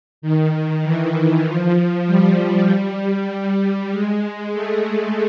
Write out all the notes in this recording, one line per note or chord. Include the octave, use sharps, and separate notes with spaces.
D#3
E3
F3
G3
G#3
A3